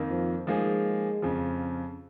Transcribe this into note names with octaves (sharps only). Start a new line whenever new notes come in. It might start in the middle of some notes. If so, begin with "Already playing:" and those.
Already playing: F2 D#3 A#3 D#4
F3
F3 G#3 A#3 D#4 G#4
F2 C#3 F3